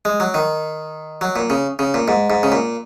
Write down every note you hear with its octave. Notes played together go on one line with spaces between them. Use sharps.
G#3
F#3
D#3
F#3
A#2
C#3
C#3
A#2
G#2
G#2
C#3
A#2